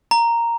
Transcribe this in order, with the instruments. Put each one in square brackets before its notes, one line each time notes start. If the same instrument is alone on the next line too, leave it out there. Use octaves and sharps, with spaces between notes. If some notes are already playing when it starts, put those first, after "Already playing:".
[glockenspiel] A#5